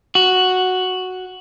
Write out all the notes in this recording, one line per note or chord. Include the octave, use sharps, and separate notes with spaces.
F#4